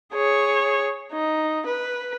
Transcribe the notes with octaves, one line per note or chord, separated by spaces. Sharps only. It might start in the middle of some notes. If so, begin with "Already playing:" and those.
G#4 C#5
D#4
B4